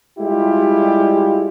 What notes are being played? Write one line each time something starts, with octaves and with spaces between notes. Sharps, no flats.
G3 G#3 E4 F4 G4